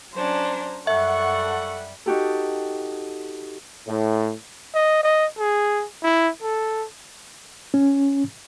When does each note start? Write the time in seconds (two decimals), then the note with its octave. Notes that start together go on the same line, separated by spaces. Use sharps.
0.14 F#3 C#4 D4 C5 A#5
0.87 F#2 G3 A4 E5 F#5 C#6
2.06 D#4 F#4 G4 A4
3.87 A2
4.74 D#5
5.03 D#5
5.38 G#4
6.03 E4
6.42 A4
7.74 C#4